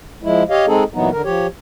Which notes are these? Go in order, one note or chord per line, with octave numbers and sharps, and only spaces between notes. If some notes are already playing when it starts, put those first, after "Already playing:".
F3 G#3 E4
G4 C#5 D#5 F5
G#3 C4 D#4 G#4 A4
A#2 E3 F#3 B3 D#4
D3 A#4
F3 G4 C#5